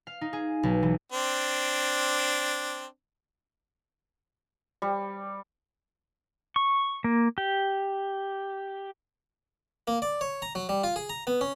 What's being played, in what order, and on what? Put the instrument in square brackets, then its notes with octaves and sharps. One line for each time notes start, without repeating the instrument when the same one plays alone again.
[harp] F5
D#4
G#4
B1
E3
[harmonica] C4 D4
[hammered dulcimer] G3
[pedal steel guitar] C#6
A#3
G4
[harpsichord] A#3
D5
C#5
A#5
F#3
G3
F4
G#4
A#5
B3
C#4